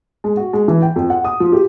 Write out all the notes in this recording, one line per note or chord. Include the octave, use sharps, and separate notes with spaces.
G#3
F#4
G#3
E3
G5
F2
F#5
D#6
F3
G4